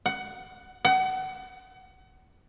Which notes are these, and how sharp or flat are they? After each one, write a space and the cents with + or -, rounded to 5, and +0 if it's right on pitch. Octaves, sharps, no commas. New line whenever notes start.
F#5 +15
F#5 +30